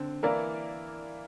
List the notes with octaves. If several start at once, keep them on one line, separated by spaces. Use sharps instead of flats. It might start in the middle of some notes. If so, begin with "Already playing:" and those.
Already playing: D3 C4
E3 A#3 E4 A#4 D5